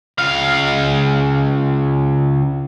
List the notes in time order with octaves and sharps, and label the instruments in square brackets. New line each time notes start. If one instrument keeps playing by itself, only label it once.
[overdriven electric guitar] C#2 F5